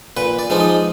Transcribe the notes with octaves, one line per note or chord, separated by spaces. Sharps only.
A#2 B4
D5
F3 G#3 D#4
D#5